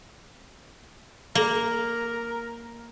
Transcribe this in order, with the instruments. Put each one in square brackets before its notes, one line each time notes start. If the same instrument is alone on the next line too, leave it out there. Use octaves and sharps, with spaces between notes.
[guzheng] A#3 [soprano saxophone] A#4